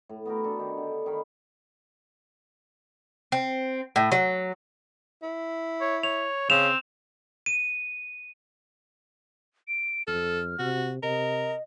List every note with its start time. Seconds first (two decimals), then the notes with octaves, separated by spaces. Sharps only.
0.09 A2
0.25 B3 F#4 G4 A#4
0.44 D4 A4
0.59 D#3 G4
0.78 D3
1.06 D#3 C#5 F5 B5
3.32 C4
3.96 A2
4.12 F#3
5.23 E4
5.81 C#5
6.03 C#5 F7
6.50 C#3 C4 E7 F7
7.46 D#7
9.68 D7
10.08 F2 A4 F6
10.59 C3 F#4
11.03 C3 A#4 D#5